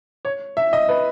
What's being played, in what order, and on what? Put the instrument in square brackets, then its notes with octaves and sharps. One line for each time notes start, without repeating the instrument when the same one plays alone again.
[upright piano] C#5
E5
D#5
B4